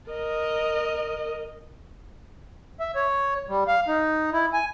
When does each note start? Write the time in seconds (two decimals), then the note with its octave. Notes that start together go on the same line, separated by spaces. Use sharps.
0.10 A#4 D#5
2.80 E5
2.95 C#5
3.48 G3
3.67 F5
3.88 D#4
4.33 E4
4.53 G#5